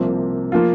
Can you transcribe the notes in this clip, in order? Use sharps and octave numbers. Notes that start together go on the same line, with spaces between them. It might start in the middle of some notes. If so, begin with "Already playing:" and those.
Already playing: C2 C3 F3 A#3 C5
F3 A#3 F4